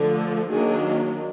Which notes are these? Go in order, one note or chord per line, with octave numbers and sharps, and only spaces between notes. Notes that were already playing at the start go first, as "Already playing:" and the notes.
Already playing: D3 F3 A3
A4
D#3 F#3 A#3 D4 G#4